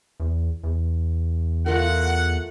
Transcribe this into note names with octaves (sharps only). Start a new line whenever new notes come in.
E2
E2
A3 F4 A#4 F#5